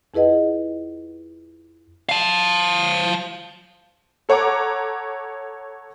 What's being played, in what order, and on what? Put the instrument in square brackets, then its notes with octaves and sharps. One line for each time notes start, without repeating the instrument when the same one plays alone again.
[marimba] F2 E4 G#4 B4 D#5 F#5
[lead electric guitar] F5 A5
[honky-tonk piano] A4 C#5 F#5 A#5 D6